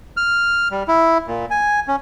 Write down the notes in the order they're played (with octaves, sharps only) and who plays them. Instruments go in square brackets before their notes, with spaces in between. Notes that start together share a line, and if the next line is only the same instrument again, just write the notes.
[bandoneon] F6
G3
E4
A#2
G#5
C#4